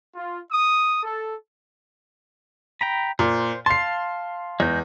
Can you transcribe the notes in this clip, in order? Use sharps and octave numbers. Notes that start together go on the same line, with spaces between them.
F4
D#6
A4
G5 A#5 B5
A#2 C5
F5 A5 C6 C7
E2 G#3 G6